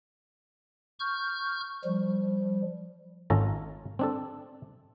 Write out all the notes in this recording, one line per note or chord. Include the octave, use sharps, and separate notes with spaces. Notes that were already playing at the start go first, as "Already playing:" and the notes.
C#6 F6 G6
F3 G3
G#1 C#4 F4 A4 A#5
C4 D4 A4